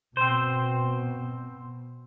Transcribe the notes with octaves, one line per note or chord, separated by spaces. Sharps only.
B2 C4 C5